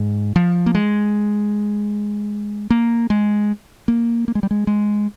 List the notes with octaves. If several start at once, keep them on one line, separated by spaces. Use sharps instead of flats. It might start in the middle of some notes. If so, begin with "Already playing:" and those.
Already playing: G#2
F3
A#3
G#3
A#3
G#3
A#3
A#3
G#3
G3
G#3
G#3